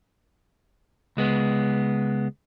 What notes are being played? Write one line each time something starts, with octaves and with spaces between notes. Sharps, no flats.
C#2 G#3 B3